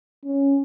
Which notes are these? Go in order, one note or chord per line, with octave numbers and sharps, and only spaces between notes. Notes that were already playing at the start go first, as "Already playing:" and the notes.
C#4